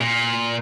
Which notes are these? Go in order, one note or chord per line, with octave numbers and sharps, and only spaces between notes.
A#2